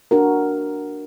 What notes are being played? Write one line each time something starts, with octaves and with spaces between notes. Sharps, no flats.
D4 F#4 A#4